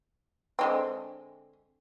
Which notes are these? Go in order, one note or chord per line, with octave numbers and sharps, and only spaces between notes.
D3 G#3 C4